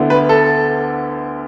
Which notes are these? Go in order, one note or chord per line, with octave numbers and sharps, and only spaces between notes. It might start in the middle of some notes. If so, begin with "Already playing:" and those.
Already playing: D2 D3 B3 E4
B4
A4